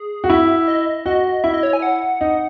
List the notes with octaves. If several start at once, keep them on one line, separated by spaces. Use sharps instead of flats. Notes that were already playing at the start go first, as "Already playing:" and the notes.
Already playing: G#4
F#4
E4 E5
D#5
F#4 D#5
E4 E5
D#5
C#5
G#5
F#5
D#4